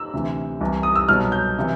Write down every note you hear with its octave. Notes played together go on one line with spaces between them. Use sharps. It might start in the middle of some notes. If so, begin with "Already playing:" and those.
Already playing: E6
D2 C3 E3
C2 C3 E3
D#6
E6
C2 B2 F#3 F6
G6
C3 E3